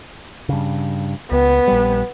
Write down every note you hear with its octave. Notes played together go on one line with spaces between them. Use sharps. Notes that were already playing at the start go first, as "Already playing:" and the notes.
G2 C#3
C#2 B3
A#1 G3